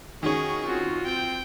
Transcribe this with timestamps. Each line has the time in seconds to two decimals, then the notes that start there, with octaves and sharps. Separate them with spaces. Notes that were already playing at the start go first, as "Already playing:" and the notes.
0.23 D#3 C#4 F#4 G#4
0.63 C4 F4 F#4
1.05 C4 G5